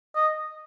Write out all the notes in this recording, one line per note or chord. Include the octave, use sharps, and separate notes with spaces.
D#5